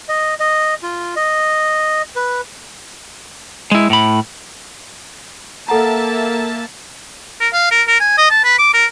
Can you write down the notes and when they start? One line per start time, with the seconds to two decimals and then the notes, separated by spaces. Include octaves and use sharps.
0.08 D#5
0.40 D#5
0.83 F4
1.16 D#5
2.16 B4
3.71 G#3 E4
3.90 A2 B5
5.68 A#3 A4 E5 F#5 A5 A#5
7.40 A#4
7.53 F5
7.71 A#4
7.88 A#4
8.00 G#5
8.18 D#5
8.30 A5
8.44 B4
8.58 D6
8.74 A#4